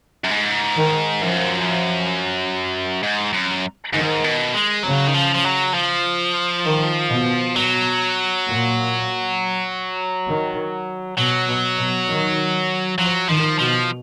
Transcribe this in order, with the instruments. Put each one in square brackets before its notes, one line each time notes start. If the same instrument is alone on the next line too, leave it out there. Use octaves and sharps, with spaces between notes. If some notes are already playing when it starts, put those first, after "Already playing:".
[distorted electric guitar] F#2
G#2
[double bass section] D#3
[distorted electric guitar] F#2 [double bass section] F3
[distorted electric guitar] G#2
F#2
[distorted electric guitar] G#2 [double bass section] D#3
[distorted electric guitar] B2
G#3
[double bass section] C#3 [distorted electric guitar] F#3
[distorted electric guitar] D#3
F3
F3
F#3
F3
[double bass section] D#3
B2
[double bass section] B2 [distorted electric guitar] F#3
[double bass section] A#2
D#3
[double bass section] B2 [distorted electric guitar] F#3
[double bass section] B2
B2
D#3
[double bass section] F3 [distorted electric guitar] F#3
[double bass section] D#3 [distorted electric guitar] F3
[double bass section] B2 [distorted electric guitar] F3